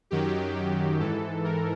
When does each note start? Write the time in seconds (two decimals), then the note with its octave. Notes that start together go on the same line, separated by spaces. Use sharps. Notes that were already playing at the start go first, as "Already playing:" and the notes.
0.11 F#2 D#3 F#3 G4
0.99 G#2 E3 A4
1.44 A#4